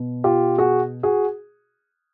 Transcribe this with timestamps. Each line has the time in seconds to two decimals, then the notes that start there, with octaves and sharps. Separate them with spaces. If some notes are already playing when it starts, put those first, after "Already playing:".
Already playing: B2
0.24 F4 G4
0.58 F#4 G#4
1.03 F#4 G#4